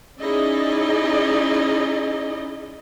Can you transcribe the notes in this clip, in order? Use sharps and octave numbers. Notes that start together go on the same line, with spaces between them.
C#4 D#4 E4 G#4 D5 D#5